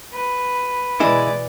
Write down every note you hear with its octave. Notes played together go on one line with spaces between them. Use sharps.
B4
B2 E3 G#3 E4 D5